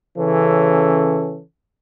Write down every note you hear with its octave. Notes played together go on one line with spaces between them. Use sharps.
C#3 E3 C#4 A4